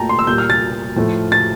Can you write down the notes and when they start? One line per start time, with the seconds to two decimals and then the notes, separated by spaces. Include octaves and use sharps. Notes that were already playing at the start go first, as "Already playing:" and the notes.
Already playing: A#2 A3 G5 A5 A#5
0.09 C6
0.19 E6
0.27 A#2 G3 A#3 G6
0.38 F6
0.50 A6
0.96 A2 F3 A3
1.32 A6